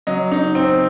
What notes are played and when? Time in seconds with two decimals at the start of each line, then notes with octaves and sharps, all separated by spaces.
0.07 F#3 D#5
0.31 D#4
0.55 C4